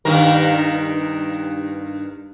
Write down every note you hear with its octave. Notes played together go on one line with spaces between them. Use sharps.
G2 D#3 A#4